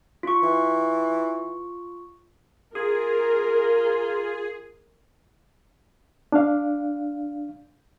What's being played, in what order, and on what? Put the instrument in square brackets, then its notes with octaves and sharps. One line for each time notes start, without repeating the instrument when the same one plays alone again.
[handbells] F4 C#6
[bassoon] E3
[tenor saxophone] F4 [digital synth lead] G#4 [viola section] A#4
[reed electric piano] D4 F5